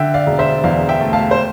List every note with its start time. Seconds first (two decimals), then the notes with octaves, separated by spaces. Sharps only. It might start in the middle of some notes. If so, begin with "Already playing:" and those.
Already playing: D3 E5 G5
0.14 D5 F5
0.26 E1
0.39 C5 E5
0.64 E2 D5 F5
0.89 E5 G5
1.01 A3
1.13 F5 A5
1.31 C5